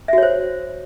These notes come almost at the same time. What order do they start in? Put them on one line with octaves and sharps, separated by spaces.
E5 F#4 C#5 C5